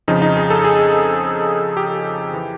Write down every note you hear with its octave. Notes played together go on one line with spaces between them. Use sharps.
F2 C#3 F3 D#4
D#4
G#4
A4
G#4
G4
E3